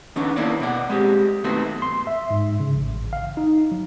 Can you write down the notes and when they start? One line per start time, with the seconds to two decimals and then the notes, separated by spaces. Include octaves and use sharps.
0.16 D#3 B3 C#4 D4
0.36 A#3 B3 E4 A4 C#5 D5
0.60 B2 D5 F#5
0.89 G#3 C4 G4
1.44 B1 D#3 A3 B3 C4 F#4
1.82 C6
2.07 E5
2.31 G#2
2.60 C#3
2.75 A1
3.13 F5
3.37 D#4
3.72 F#3